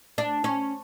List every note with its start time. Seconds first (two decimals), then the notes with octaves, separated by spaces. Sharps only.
0.18 D4
0.44 C#4